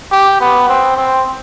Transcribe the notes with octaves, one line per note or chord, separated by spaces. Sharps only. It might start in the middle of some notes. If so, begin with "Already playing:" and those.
G4
B3
C4
C4